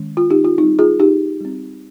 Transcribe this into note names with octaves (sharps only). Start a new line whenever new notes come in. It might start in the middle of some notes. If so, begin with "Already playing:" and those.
Already playing: D#3 G#3 C#4
F4
D#4 G4
F4
G3 C4 D#4
F4 G#4
D#4 G4
G3 C4